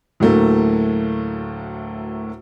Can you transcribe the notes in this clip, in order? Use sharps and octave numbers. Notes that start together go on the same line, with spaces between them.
D2 A2 F#3 A3 A#3